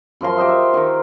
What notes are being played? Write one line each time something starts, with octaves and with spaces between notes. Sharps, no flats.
F#2 F3 A#4 C6
G4 C5 D#5 E5
E5
D#3 A#4